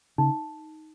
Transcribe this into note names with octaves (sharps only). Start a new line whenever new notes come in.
C#3 D#4